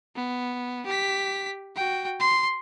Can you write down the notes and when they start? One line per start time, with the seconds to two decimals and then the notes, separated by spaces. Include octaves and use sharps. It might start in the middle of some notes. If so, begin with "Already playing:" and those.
0.15 B3
0.86 G4 B6
1.76 F#4 G5
2.20 C6